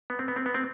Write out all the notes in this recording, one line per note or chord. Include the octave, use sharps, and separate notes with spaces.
B3
C4
B3
C4
B3
C4